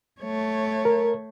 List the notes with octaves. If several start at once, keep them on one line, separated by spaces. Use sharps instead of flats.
A3 C#5
A#4